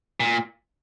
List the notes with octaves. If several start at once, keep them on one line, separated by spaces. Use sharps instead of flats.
A#2